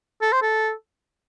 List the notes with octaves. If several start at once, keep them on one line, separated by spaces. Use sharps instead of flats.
A4
C5
A4